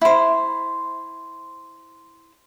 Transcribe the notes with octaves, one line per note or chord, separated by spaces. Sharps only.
E4 C5